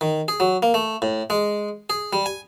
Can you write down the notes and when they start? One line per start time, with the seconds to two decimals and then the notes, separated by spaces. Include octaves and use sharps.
0.01 D#3
0.28 G#4
0.40 F#3
0.63 A#3
0.74 A3
1.02 A2
1.30 G#3
1.90 G#4
2.13 G3
2.26 G#5